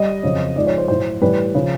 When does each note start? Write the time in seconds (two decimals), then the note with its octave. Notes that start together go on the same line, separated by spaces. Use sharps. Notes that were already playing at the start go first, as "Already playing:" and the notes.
Already playing: G3 D#5
0.23 F2 C#3 F#3
0.56 G#2 F3 G#3 D5
0.67 C#5
0.78 C5
0.88 A2 F#3 C5
1.21 A2 E3 G3 B4
1.55 C#3 F3